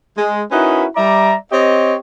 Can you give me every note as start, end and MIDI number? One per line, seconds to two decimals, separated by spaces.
0.17 0.42 56
0.50 0.85 61
0.50 0.85 63
0.50 0.85 64
0.50 0.85 66
0.50 0.85 70
0.50 0.85 71
0.96 1.34 55
0.96 1.34 74
0.96 1.34 76
0.96 1.34 82
1.51 1.94 60
1.51 1.94 67
1.51 1.94 73
1.51 1.94 75